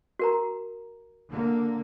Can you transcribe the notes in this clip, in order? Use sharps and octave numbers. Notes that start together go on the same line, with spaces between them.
F#4 A#4 A#5
D3 A#3